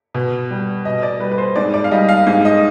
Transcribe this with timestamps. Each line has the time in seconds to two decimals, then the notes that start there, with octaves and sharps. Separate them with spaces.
0.14 B2
0.51 G3
0.85 B2 D#5
1.03 D5
1.20 G3 B4
1.32 B4
1.38 C5
1.56 G#2 D5
1.74 D5
1.84 F5
1.91 G3 D#5
2.09 F5
2.26 G#2 F5
2.45 D#5